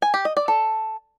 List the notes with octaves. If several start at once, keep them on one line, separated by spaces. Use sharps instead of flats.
G#5
G4
D#5
D5
A4